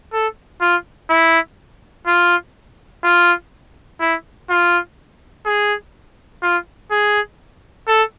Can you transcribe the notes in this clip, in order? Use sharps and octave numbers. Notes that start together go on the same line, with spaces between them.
A4
F4
E4
F4
F4
E4
F4
G#4
F4
G#4
A4